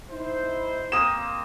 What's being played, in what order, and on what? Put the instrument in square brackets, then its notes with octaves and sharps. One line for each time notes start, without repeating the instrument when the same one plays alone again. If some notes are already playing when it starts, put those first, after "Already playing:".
[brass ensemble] D#4 E4 C5
[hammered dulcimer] A#3 C4 [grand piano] D#6 E7